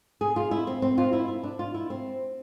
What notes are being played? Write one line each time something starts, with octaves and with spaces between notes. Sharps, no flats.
G#4
F4
E4
C4
C4
F4
E4
E4
D4
F4
E4
C4